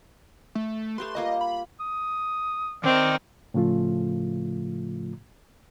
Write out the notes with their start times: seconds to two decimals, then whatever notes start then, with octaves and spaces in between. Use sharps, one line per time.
0.55 A3
0.98 A3 G4 B4 C6
1.15 G3 A#3 F4 D#5
1.41 B5
1.80 D#6
2.84 D#3 C4 A#4 D5 D#5
3.54 A2 C#3 F3 A3 F4